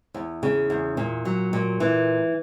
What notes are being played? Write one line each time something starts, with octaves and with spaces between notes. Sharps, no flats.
E2
C#3
E2
A#2
F#3
A#2
E3